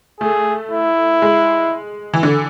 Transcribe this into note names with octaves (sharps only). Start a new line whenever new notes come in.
A3 G#4
E4
G#3
E3
D3